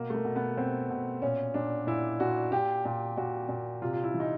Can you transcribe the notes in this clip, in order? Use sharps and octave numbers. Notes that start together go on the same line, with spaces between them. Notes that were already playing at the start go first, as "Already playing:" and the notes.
Already playing: B2 A#3
A3
A#3
B2
B3
B2 C4
B2
A#2 C#4
A#2 D4
A#2 E4
A#2 F#4
A#2 G4
A#2 G4
A#2 F#4
A#2
C3 F4
F4
E4
E3
D#4